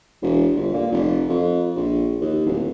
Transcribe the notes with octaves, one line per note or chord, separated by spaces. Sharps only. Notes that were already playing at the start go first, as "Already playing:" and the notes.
E1
G1
A#2
F1
F2
A#1
D#2
D1